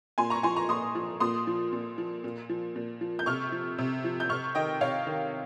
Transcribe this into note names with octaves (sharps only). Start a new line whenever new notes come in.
A#2 G#5 C6
A#5 C#6
F3 G#5 C6
A#5 C#6
A#2 C6 D#6
F3
A#2 C6 D#6
F3
A#2
F3
A#2
F3
A#2
F3
G6
C3 C#6 F6
F3
C3
F3
G6
C3 C#6 F6
D#3 D#5 G5
C3 C#5 F5
D#3